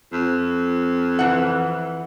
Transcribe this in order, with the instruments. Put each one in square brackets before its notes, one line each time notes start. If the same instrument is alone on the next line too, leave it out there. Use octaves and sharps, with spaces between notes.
[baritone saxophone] F2
[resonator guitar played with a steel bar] E3 F#5